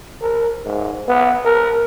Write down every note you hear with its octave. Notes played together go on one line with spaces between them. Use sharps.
A#4
G#2
B3
A#4